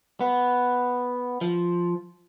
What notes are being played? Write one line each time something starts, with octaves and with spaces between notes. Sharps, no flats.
B3
F3